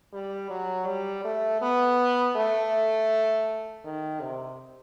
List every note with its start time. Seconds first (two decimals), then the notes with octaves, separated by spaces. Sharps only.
0.13 G3
0.50 F#3
0.87 G3
1.25 A3
1.62 B3
2.36 A3
3.85 D#3
4.21 C3